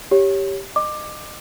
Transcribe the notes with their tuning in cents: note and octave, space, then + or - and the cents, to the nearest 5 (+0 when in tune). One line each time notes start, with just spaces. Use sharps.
G4 +0 C#5 +0
D#5 -35 D6 +15